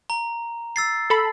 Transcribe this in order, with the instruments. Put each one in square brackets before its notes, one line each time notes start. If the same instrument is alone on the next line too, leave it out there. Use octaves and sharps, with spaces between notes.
[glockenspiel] A#5
E6 A6 C7
[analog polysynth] A4 B5